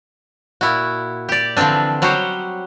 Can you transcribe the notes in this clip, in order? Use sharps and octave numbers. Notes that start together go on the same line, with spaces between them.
A#2 E4 F#4
G4 D5
D3 E3 F3 C4 D4
F#3 G3 F#4 C5 C#5